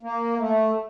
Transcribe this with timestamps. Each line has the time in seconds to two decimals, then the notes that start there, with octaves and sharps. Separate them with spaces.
0.03 A#3
0.39 A3